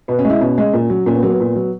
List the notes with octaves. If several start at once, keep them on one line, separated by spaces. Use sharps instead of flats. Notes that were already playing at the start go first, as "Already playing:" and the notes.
B2 B3
C#4
G#3
E4
B2 C#4
G#3
A#2
F#3
A#2 C#4
B3
F#3 A#3
B3
A#2
F#3